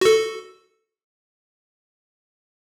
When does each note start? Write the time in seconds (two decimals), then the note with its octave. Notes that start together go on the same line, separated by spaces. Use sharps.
0.01 F#4 A4